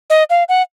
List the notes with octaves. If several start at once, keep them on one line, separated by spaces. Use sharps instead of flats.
D#5
F5
F#5